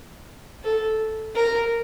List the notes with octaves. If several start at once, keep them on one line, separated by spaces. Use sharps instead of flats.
A4
A#4